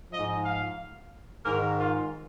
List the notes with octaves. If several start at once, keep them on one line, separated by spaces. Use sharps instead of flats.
G#2 F3 D#5
F5
G#2 D#3 A#4
F4